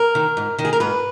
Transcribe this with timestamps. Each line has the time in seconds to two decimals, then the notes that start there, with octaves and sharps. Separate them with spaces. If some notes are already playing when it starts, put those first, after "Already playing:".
Already playing: A#4
0.15 D#3
0.37 G#2
0.59 D#3
0.65 G#4
0.73 A#4
0.80 G#2 B4